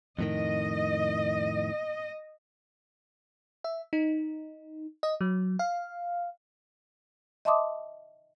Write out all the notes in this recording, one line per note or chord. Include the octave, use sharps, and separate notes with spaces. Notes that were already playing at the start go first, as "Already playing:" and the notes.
F2 A2 D#3 D#5
E5
D#4
D#5
F#3
F5
D#5 E5 A5 C6 D6 D#6